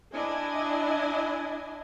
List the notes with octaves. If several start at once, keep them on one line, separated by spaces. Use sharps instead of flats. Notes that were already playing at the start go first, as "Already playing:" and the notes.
D4 E4 D#5 G#5